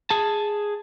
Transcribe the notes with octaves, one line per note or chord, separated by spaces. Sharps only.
G#4 A5